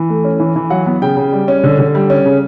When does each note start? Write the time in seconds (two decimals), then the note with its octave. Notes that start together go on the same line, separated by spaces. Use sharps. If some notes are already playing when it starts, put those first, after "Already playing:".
Already playing: E3
0.10 A3
0.24 C#4
0.40 E3
0.56 E3
0.70 F#3 F#5
0.86 B3
1.02 C#3 G5
1.17 C#3
1.32 G3
1.48 C#4
1.64 D3
1.79 D3
1.95 G3
2.10 C#4
2.26 C#3